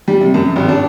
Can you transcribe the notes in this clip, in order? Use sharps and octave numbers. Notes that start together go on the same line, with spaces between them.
G3
C3
F#2
G#1
D4